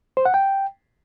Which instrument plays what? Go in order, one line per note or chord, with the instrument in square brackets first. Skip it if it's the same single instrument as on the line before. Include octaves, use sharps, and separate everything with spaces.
[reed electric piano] C5
F#5
G5